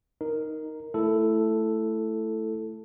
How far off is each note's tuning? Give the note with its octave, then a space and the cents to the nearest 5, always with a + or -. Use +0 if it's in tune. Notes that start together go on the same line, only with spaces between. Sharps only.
D#4 +0 A#4 +0
A3 +0 E4 +10 A4 +0